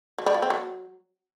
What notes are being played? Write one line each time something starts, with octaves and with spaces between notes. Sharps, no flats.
F#3
G3
F3
C4
F#3